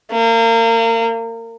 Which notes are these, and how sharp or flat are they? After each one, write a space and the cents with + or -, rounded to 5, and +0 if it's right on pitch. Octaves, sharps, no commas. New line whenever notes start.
A#3 -30